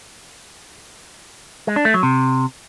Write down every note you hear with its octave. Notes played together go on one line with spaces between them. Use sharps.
G#3
D4
A3
F#3
C3